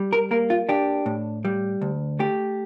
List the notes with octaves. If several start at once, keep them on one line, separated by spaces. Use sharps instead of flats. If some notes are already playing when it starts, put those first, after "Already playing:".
Already playing: G3
A#4
A#3 A#4
F4
D4 G4
A2
G3
D2
A3 G4